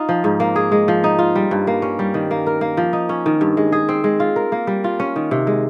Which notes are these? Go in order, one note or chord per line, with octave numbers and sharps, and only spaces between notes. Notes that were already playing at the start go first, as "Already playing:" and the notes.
Already playing: D#4 F4
F3
G#2
A#3
G#4
G#3
F3
D#4
F4
G3
G2
A#3
C#4
G3
D#3
A#3
A#4
A#3
F3
D#4
C#4
D#3
G2
G#3
G#4
C4
G#3
F4
A#4
A#3
G3
F4
C#4
D#3
C3
G#3